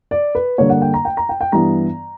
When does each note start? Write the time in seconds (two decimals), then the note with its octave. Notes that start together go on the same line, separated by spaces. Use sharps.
0.11 D5
0.35 B4
0.58 G2 D3 A#3 C#5
0.70 F#5
0.82 G5
0.94 A#5
1.05 G5
1.17 A#5
1.29 G5
1.41 G5
1.52 G2 E3 B3 A#5